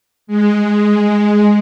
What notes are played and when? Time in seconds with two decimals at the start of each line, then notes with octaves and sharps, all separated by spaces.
0.27 G#3